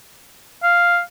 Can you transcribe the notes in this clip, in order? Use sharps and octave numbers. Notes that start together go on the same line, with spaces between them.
F5